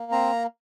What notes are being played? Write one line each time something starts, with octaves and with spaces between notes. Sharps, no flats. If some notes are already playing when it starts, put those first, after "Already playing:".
Already playing: A#3
C4 A#5